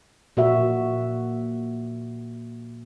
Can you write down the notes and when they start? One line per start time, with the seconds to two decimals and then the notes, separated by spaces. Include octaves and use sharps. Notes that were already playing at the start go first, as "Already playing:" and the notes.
0.37 A#2 F#4 E5